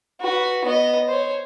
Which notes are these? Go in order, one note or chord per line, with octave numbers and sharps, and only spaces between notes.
F#4 B4
B3 D#5
C5 C#5